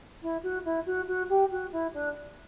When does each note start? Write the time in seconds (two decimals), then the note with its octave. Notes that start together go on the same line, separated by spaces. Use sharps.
0.21 E4
0.42 F#4
0.64 E4
0.85 F#4
1.07 F#4
1.29 G4
1.51 F#4
1.71 E4
1.93 D4